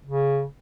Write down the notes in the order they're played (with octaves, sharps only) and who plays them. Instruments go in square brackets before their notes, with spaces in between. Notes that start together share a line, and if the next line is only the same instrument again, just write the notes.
[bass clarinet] C#3